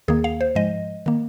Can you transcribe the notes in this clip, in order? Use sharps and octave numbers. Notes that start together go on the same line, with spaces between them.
D#2 D#3 A#3 G#4
F5
C5
G#2 F3 G#3 D#5
D#3 A#3